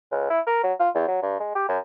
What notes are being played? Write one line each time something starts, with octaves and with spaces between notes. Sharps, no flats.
C#2
E4
A#4
F#3
F4
E2
F#3
G2
G#3
G4
F#2